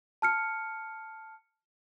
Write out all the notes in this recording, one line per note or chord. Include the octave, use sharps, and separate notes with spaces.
A5 F6 C#7